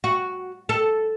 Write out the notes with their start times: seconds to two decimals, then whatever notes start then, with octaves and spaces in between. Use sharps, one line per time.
0.04 F#4
0.69 A4